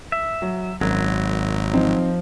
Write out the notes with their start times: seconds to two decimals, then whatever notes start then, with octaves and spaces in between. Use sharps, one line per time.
0.12 E5
0.42 F#3
0.81 G#1 F#2 F#3
1.73 F3 C4 D#4